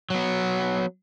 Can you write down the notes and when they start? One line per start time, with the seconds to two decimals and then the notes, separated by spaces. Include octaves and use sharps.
0.10 F#3 B3